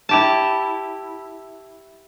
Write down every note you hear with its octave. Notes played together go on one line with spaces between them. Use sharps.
E4 G4 A5